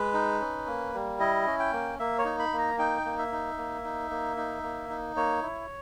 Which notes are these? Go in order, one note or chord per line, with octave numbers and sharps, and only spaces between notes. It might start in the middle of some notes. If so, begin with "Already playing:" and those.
Already playing: G#3 B4
D#4
C#4
A#3
G3
E4 D#5
C#4
G5
A#3
A#3 E5
C#5
D#4
B5
A#3
A#5
D#4 G5
A#3
E5
D#4
A#3
D#4
A#3
D#4
A#3
D#4
A#3 C#5
E4